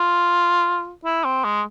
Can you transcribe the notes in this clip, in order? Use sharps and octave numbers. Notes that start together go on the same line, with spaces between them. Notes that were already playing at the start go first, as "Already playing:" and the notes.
Already playing: F4
E4
C4
G#3